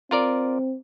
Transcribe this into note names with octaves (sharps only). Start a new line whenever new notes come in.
C4 F4 A#4 D5